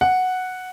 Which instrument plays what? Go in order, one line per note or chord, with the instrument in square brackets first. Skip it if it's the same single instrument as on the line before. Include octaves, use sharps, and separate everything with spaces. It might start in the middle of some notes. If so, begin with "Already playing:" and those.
[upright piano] F#5